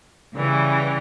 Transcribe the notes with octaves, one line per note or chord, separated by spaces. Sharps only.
C#3 E3 G3